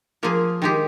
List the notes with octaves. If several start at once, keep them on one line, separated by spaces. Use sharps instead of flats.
F3 A#3 F4 G#4
D#3 G#3 D#4 G4